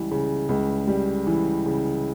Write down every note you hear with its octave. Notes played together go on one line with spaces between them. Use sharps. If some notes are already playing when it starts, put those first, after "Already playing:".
Already playing: C#2 E3 G3
C#3
C#2
G3
E3
C#3